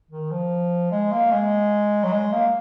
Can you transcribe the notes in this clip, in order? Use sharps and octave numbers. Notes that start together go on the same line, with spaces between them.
D#3
F3
G#3
A#3
G#3
F#3
G#3
A#3